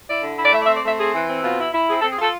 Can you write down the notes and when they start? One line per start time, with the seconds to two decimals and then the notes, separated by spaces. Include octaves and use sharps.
0.08 E4 D5
0.23 D3
0.38 E4
0.44 D5
0.53 A3 E5
0.60 D5
0.65 E5
0.68 C4
0.75 D5
0.84 A3 E5
0.98 C4 G#4
1.14 E3
1.28 C4
1.43 B2 F4
1.59 E4
1.73 E4
1.88 C4 G#4
2.00 A4
2.03 C4
2.11 G#4
2.19 F4 A4